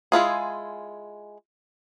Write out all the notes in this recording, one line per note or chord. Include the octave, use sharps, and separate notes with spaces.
G#3 E4 F4 G#4